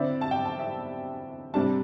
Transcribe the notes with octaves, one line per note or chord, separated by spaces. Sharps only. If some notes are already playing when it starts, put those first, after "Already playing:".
Already playing: D3 C4 E4 D5
A5
G5
A5
E5
C3 G3 D4 A5